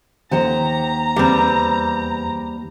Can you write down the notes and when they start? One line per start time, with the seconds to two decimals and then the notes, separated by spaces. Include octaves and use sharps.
0.31 D#2 G4 C5 F#5 A#5
1.16 E2 G3 C4